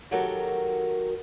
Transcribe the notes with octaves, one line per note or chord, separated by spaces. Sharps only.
D#3 F#3 F#4 G4 A4 A#4